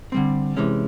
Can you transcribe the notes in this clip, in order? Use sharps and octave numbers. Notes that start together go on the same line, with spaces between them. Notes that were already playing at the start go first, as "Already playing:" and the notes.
D3 G3 C4
C3 E3 G#3 C#4